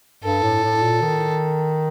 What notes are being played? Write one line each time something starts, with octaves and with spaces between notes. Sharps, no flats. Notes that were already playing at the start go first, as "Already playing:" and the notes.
G2 A4
A2
A2
A#2
D#3